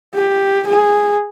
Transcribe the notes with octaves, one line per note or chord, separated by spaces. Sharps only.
G4
G#4